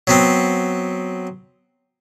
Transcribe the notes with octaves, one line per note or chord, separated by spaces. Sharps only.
F#3 B3 C4